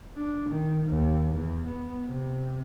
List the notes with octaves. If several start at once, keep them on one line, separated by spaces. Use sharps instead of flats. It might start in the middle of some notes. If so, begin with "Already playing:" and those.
D4
D#3
D#2
E2
B3
C3